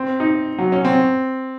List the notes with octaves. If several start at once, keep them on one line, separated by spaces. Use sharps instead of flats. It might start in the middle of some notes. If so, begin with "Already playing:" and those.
Already playing: C4
D#4
F#3
C#4
C4